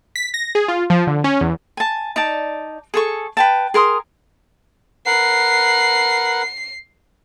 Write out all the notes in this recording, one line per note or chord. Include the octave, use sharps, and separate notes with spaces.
B6
A#6
G#4
F4
F3
D3
C#4
E2
G#5 A5
D#4 D5 A5
G#4 A4 C#6
B4 G5 A5
G#4 A#4 C6 D#6
A#4 B4 F#5 C7